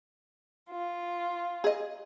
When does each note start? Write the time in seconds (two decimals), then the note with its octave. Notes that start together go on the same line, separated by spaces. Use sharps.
0.70 F4
1.64 G#4 D#5